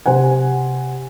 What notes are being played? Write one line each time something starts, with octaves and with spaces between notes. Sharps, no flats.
C3 C5 F#5 G#5